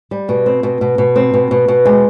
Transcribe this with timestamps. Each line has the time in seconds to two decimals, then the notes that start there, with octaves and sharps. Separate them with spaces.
0.11 G3
0.29 B2
0.46 C4
0.63 B2
0.81 B2
0.98 B2
1.16 C4
1.34 B2
1.51 B2
1.68 B2
1.85 G#3